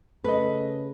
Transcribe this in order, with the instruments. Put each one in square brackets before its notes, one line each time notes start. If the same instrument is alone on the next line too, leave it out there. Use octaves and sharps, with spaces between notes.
[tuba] C#3 [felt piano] A3 D#5 [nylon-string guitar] B4